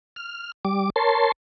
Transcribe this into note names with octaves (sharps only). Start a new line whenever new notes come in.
F6
G3 D6
A#4 C#5 A5 C6